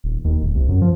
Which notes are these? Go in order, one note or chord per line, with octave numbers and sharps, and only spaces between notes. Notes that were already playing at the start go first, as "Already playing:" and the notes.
D#1
D#2
D1
C2
F#2
F3